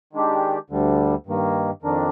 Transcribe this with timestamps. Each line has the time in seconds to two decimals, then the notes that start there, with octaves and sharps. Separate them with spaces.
0.13 D#3 G#3 D4 G4
0.70 D2 D3 G3
1.26 G2 D#3 A#3
1.82 F2 D#3 A#3 D4